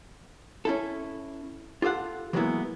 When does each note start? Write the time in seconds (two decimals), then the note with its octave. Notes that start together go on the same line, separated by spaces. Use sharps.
0.65 C#4 E4 A4
1.82 F4 G4 A4 F5 F#5
2.33 E3 F#3 G#3 A#3 B3 E4